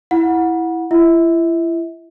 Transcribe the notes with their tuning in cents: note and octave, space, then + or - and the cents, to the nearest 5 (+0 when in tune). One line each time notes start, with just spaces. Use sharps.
E4 +0 F#5 -20 B5 -35
E4 +35 E5 -35